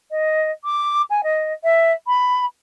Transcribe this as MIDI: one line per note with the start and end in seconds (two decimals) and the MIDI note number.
0.11 0.50 75
0.64 1.02 86
1.10 1.21 80
1.23 1.52 75
1.63 1.92 76
2.07 2.44 83